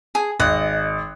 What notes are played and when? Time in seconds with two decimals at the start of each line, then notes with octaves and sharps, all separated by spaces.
0.15 G#4
0.40 G#1 D#5 F#6